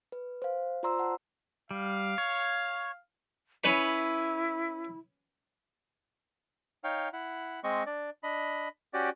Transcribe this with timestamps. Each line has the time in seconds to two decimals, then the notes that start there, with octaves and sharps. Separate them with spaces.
0.12 B4
0.42 C5 F5
0.83 F4 C5 D5 A#5 C6 E6
0.99 F#5 A5
1.71 G3 F5
2.18 C#5
3.64 C#4 E4 B4 B5
6.84 D#4 C#5 F5 G5
7.13 E4 F#5
7.64 G#3 C4 D#5 C#6
7.86 D4 D5
8.23 D4 D#5 B5
8.94 C#4 F#4 G4 D5